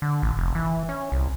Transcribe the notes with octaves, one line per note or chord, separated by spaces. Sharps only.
D3
A1
F1
E3
C#4
C2